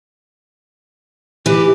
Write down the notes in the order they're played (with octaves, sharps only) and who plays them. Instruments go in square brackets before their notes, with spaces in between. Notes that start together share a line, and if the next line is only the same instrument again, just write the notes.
[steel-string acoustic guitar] E3 [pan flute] G4